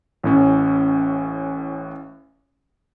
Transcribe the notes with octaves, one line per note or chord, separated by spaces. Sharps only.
A1 A2 C#4